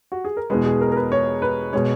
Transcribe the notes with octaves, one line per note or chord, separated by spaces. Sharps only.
F#4
G#4
A#4
E2 B2 G#3 B4
G#4
A#4
A#4
B4
C#5
B4
B2 G#3 C#5